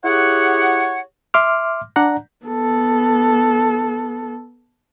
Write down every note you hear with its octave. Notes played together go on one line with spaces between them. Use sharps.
E4 G4 G#4 C#5 F#5
E5 C6 D6 F6
D4 D5 F#5 A#5
B3 A4